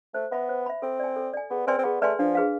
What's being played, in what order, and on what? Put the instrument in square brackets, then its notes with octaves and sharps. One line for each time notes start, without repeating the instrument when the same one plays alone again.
[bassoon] A3 [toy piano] C5
[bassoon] B3 [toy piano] E5 B5
[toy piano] C5
E5 B5
[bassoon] C4 [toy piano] A4
[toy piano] D5 G#5
A4
D5 G#5
[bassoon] B3 [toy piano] G#4
[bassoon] C4 [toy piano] B4 D5 G#5 C6
[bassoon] C4
[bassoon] B3 [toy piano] G#4
[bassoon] A3 [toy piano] B4 D5 G#5 C6
[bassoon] F3 [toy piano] D4
[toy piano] G#4 B4 F5